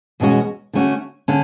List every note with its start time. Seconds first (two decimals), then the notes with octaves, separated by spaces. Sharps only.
0.20 E2 B2 G#3 C#4 F#4
0.73 D3 A3 C#4 F#4
1.28 D3 C#4